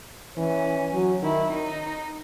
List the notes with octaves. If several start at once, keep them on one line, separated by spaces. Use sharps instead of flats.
E3 C#4
F#3
D#3 E4
D#4